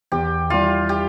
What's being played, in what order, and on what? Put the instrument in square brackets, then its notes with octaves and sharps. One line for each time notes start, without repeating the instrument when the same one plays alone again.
[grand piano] E2 [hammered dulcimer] G4
[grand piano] E3 G3 [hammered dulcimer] F4
[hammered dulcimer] G4